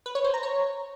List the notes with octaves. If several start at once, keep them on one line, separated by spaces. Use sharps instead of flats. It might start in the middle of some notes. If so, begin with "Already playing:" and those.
B4
C#5
C5
A#5
C#5